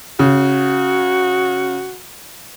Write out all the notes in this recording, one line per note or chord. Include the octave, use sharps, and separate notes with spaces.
C#3 F#4